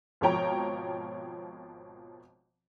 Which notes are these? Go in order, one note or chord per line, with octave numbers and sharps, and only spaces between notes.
G#1 B2 F3 C#5 G5 A#5